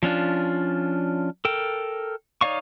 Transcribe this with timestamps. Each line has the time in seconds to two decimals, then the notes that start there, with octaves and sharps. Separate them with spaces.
0.03 F3 C#4 D4 F4
1.45 A4 A#4 G5
2.41 D#4 C#5 D5 F5 C#6